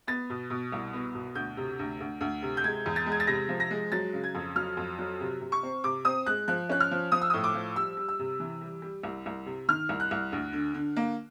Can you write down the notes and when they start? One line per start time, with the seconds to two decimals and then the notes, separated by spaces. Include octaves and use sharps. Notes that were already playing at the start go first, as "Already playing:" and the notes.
0.07 B3 A6
0.30 B2
0.50 B2
0.72 C2
0.93 B3
1.15 B2
1.35 D2 G6
1.57 C3
1.79 D2
2.00 D2
2.21 D2
2.42 C3
2.57 G6
2.64 G#3 G#6
2.86 E2
2.96 A6
3.06 G#3
3.12 G#6
3.20 A6
3.27 C3 A#6
3.49 F3
3.60 A#6
3.71 G#3
3.92 F#3 A6
4.13 C#3
4.24 G#6
4.35 F2
4.56 F#3 F6
4.77 F2
4.99 F#3
5.21 C3
5.41 C3
5.52 C#6
5.63 C4
5.84 C3 D6
6.05 C4 D#6
6.26 G#3 F#6
6.48 F3 F#6
6.69 C#4 F#6
6.80 F6
6.91 F3
7.12 F3 D#6
7.21 E6
7.30 A2 D#6
7.44 D6
7.54 F3
7.76 G3 E6
7.97 G3
8.09 E6
8.19 C3
8.40 E3
8.61 G3
8.82 G3
9.03 C2
9.26 C2
9.46 C3
9.68 D#3 F6
9.89 C2
10.00 F#6
10.11 C2
10.32 D2
10.53 D3
10.74 D3
10.96 A#3